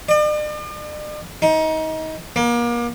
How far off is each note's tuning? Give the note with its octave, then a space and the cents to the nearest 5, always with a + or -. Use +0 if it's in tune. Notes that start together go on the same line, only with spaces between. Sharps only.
D5 +45
D#4 +25
A#3 +35